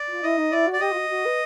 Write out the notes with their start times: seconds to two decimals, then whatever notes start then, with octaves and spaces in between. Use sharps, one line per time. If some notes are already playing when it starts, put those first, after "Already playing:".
Already playing: D5
0.09 F4
0.22 E4 D#5
0.38 D#4
0.51 E4 D5
0.67 F#4
0.73 D5
0.80 G4 D#5
0.92 F4
0.96 F#4
1.10 F#4
1.25 B4